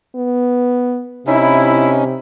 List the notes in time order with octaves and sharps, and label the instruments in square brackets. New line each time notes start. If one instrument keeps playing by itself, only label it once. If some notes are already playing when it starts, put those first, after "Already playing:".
[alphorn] B3
[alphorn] C3 [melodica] C#4 D#4 [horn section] E4